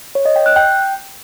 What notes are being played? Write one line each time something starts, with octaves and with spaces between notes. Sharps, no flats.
C#5
D#5
G5
F#6
G5